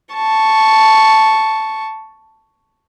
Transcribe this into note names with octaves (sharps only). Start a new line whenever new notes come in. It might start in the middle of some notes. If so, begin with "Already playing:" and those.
A5 C#6